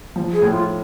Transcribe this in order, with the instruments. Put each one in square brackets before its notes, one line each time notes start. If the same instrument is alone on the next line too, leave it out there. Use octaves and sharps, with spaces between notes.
[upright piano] F3
[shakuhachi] G#4
[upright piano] A2
[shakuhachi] F4